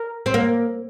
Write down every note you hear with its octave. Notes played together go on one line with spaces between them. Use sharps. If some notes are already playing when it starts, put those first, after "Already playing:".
Already playing: A#4
C4
A#3